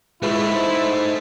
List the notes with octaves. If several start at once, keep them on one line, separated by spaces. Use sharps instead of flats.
A2 G#3 A3 E4 F4 G#4 B4
D#4 C5